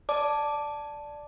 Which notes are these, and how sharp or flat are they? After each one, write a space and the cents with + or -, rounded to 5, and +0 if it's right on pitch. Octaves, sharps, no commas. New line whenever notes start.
D5 +0 A5 +0 D6 +0